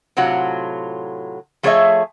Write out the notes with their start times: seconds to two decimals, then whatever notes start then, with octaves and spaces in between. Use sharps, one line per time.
0.17 A2 C3 F#3 F4 F#5
1.63 F3 A3 G#4 C#5 D#5 E5